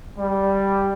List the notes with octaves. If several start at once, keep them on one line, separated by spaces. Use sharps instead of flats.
G3